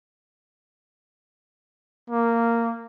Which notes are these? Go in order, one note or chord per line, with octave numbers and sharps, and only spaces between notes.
A#3